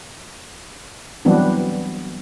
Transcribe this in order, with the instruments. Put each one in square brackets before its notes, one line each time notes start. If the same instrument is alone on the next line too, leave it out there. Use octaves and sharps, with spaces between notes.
[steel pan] E3 F#3 G3 B3 C4 D4